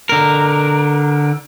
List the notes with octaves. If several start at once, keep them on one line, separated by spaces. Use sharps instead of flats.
D3 A#4